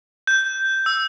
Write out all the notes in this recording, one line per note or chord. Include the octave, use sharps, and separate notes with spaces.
G6
E6